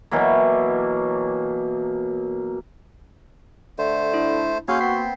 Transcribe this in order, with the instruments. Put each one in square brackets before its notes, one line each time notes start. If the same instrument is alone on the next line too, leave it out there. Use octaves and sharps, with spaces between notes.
[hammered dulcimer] B2 E3 F#3 A#3
[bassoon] D3 [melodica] A3 C5
[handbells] D4 E4
[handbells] A#3 C6 G6 [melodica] C#4 G#4 F5 [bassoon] F#4
[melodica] B3 C4 [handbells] B6 C7